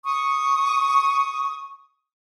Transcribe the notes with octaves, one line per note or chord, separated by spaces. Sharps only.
C#6 D#6